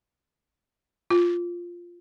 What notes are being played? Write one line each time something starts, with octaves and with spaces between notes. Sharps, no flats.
F4